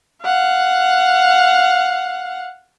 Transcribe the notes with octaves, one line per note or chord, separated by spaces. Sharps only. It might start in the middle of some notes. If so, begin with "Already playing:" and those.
F5 F#5